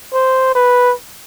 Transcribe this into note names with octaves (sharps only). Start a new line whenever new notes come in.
C5
B4